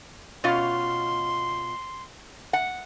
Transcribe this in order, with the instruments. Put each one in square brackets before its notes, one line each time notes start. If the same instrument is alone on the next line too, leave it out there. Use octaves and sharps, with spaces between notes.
[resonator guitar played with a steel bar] B2 C#4 F4 [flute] C6
[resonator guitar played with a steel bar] F#5